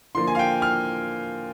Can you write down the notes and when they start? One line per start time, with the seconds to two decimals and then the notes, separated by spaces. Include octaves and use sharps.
0.15 D3 F3 A#3 C6
0.27 G#5
0.35 F5
0.39 G5
0.62 F6